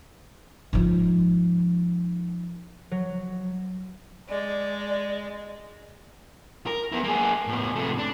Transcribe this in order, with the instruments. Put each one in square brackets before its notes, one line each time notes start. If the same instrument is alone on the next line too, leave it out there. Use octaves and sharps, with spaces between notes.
[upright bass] G#2 F3
[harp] F#3
[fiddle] G#3 [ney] D5
[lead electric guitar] A#4
B3 E4
A#3 G#4
A2 B3
C3 A3
D4